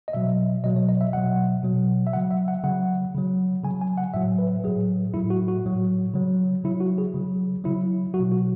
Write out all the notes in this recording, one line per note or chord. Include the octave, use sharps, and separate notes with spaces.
D#5
B2 F#3 E5
B2 F#3 D#5
C#5
D#5
E5
B2 F#3 F#5
B2 F#3
E5
C#3 F#3 F#5
E5
F#5
C#3 F#3 F#5
C#3 F#3
C#3 F#3 G#5
G#5
F#5
A2 F#3 E5
B4
A2 F#3 G#4
A2 F#3 E4
F#4
F#4
A2 F#3
C#3 F#3
C#3 F#3 E4
F#4
G#4
C#3 F#3
C#3 F#3 E4
F#3 F#4
B2
F#4